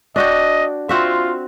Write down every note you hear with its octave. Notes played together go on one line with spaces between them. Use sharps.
D4 F#4 D#5 G5
C4 F4 F#4 E5